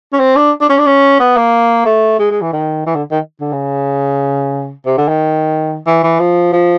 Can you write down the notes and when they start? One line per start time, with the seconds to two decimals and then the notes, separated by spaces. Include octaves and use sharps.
0.13 C#4
0.19 C4
0.36 D4
0.61 D4
0.69 C#4
0.78 D4
0.86 C#4
1.20 B3
1.37 A#3
1.86 A3
2.19 G#3
2.31 G#3
2.41 E3
2.53 D#3
2.87 E3
2.95 D3
3.11 D#3
3.41 D3
3.53 C#3
4.86 C3
4.98 D3
5.08 D#3
5.86 E3
6.03 E3
6.20 F3
6.53 F3